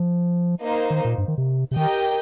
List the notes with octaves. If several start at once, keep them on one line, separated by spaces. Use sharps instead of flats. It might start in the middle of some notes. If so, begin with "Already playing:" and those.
Already playing: F3
A#3 D#4 C5
D#3
A#2
G2
D#3
C3
C3
D#3 G4 A#4 D#5 G5